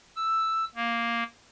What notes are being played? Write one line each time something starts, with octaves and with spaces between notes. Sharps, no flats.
E6
A#3